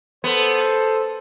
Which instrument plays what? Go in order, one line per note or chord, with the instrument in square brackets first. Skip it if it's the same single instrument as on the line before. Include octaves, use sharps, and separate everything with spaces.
[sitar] B3 [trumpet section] A4 C5